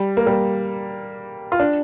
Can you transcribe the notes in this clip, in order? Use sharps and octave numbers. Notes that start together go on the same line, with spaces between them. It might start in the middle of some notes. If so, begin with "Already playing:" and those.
Already playing: G3
A#3
G3
F4
D4